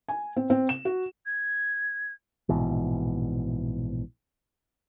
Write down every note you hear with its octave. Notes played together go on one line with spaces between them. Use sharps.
G#5
C4
C4
E7
F#4
G#6
A#1 G#2 B2 E3